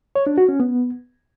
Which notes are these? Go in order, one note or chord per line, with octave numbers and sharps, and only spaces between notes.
C#5
D4
F#4
C#4
B3